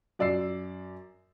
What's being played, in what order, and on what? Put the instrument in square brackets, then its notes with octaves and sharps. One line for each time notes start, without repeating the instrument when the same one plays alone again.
[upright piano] F#2 D5 E6 C7